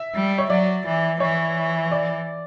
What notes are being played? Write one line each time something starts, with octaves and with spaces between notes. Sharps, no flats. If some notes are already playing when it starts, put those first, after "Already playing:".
Already playing: E5
G3
C#5
F#3 D5
E3
E3 C#5
D5